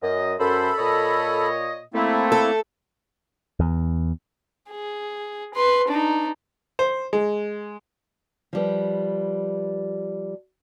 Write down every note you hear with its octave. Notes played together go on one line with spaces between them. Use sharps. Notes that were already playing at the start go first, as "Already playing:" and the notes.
F#2 D#5
F#2 A4 C5 B5
A#2 C#5 D#5
A3 A#3 C4 E4
A4
E2
G#4
B4 C6
D4 D#4
C5
G#3
F3 G3 B4